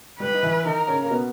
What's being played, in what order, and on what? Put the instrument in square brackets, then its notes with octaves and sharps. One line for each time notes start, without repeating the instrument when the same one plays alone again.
[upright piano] G3 G4 [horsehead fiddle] B4
[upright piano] D#4
E3 E4
[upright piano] D#3 D#4 [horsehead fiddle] A#4
[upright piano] C#3 C#4
A#3
B2 B3